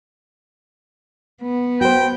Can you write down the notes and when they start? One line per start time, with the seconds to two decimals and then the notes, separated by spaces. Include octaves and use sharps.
1.42 B3
1.81 F#4 C5 G5